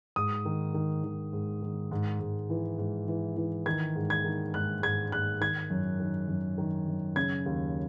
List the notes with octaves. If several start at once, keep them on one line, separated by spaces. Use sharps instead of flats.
G#2 D#6
D#3
D#3
D#3
G#2
D#3
G#2
G#2
E3
G#2
E3
E3
D#3 G#6
G#2
G#6
D#3
G#2 F#6
G#2 G#6
G#2 F#6
D#3 G#6
F#2
D#3
F#2
D#3
F#2
C#3 G#6
D#2